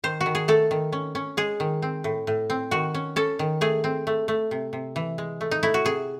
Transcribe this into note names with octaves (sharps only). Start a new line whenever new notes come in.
D#3 C5
F#4
D#3
G#4
A3 A4
D#3
C#4
C#4
G#3 G#4
D#3
C4
A2
A2
C4
D#3 F#4
C#4
C#4 A4
D#3
A3 G#4
C4
A3
A3
C3
C3
E3
G#3
A3
D#4
A3 E4
F#4
C3 G#4